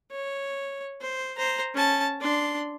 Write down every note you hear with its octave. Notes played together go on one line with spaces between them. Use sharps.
C#5
C5
C5 A#5
C#4 A5
D4 C6